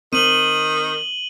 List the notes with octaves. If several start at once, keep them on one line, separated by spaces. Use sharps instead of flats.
D#3 C4 D#7 F#7 G7